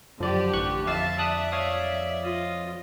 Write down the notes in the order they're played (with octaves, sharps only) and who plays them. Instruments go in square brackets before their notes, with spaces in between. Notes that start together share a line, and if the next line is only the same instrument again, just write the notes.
[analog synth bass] F#2 [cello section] D3 G4 [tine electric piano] F3 D5
[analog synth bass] A1 [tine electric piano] C#6 F#6
[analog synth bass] F2 [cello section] E5 [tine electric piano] F5 [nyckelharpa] A5
[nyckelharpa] D5 [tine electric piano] A5 D#6 F#6
[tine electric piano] C#5 F5 D#6
[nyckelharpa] F4 D#5